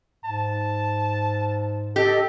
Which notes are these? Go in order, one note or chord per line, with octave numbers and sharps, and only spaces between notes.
G#2 A5
G4 A4 D#5